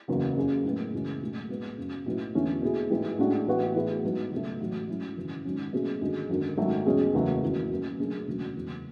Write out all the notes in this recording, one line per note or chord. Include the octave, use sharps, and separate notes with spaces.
F#1 E2 C#3 F#3
F#2 C#3 F#3 C#4 G#4
A2 G#3 B3
F#1 F#2 E3 G#3 C#4
B1 A2 G#3
B1 A2 G#3 B3
F#1 F#2 C#3
B1 A2 F#3 B3 E4
E2 D3 A3 C#4 E4
B2 A3 E4 G#4
A1 G#2 E3 G#3
A2 G#3 D4 F#4
A1 A2 E3 B3 F#4
A2 E3 B3 E4 G#4
G#2 F#3 B3
C#2 B2 A3
A1 A2 F#3
G#2 F#3 C#4 E4
G#1 F#2 C#3 E3
G#1 G#2 F#3 C#4
B2 A3 C#4 G#4
G#1 F#2 D3 G#3
G#1 F#2 D3
G#1 G#2 F#3 A3
E2 B2 G#3 C#4 G#4
F#1 E2 C#3 F#3 A3
G#1 F#2 E3
F#2 C#3 F#3 B3
B2 A3 D4 G#4
E1 D2 C#3 F#3
F#1 E2 B2